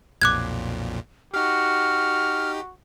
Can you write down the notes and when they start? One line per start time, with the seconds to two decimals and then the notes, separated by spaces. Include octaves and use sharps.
0.22 B1 F2 A#2 D6 F#6 G#6
1.34 D#4 F#4 G4 F6